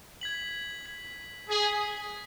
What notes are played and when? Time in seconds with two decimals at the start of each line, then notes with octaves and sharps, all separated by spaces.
0.21 G#6 B6 F#7
0.86 G#6 B6 F#7
1.49 G#4 G#6 B6 F#7